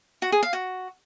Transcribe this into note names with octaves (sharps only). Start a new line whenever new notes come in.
F#4
G#4
F5
F#4